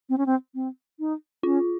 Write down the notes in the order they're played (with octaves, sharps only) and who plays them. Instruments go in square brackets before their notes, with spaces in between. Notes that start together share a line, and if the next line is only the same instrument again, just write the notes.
[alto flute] C4
C#4
C4
C4
D#4
[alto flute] C#4 [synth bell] F4